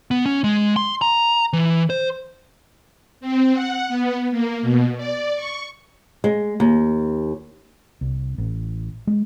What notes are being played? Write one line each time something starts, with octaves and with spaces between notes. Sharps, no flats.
B3
C#4
G#3
C6
A#5
E3
C5
C4
F#5
B3
A#3
B2
D5
C#6
G#3
D#2
C2
A1
G#3